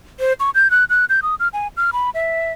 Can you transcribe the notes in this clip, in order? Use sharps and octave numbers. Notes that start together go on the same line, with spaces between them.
C5
C#6
G6
F#6
F#6
G6
D#6
F6
G#5
F6
B5
E5